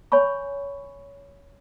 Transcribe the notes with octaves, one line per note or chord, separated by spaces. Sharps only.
C#5 G#5 B5 C#6